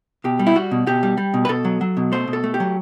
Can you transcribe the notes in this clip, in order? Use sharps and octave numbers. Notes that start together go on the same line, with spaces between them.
B2 G4
G3
E4
G3 F#4
B2
B2 G4
G3
G3
B2
B4
B2 A4
F#3
F#3
B2
A3 C5
B2
A4
A3
G4
F#3